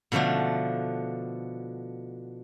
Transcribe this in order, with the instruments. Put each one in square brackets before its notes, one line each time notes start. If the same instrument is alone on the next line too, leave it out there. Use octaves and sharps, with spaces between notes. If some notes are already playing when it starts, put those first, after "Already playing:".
[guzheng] B2 D3 F3 A3 D4